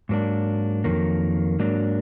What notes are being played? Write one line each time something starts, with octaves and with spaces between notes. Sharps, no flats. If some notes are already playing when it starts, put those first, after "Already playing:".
G#2 F#3 A#3 D4
F2 D#3 F#3 A#3
G#2 F#3 A#3 D4